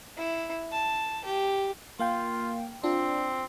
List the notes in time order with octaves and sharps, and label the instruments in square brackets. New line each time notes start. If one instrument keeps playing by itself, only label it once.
[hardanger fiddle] E4
A5
G4
[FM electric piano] A#3 F5 G5 [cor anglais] F4
[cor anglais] C4 [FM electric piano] D4 F4